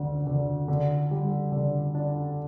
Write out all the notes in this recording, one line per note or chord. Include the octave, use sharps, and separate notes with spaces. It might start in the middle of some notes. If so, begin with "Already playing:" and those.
Already playing: D2 D3
D3
D3
G3
D3
D4